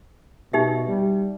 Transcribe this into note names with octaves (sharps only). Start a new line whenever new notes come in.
B2 D#4 G4 E5
G3